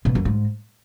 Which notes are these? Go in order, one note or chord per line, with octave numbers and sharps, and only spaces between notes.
B2
F#2
G#2